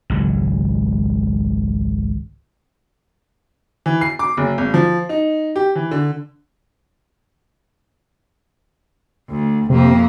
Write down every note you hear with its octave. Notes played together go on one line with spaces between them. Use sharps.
G#1 C#2 F#3
E3
C7
D6
F#1
G#1
F3
D#4
G4
E3
D3
D2
F2 C3 A#3